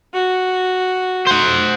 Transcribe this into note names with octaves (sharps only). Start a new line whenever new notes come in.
F#4
C5 F#5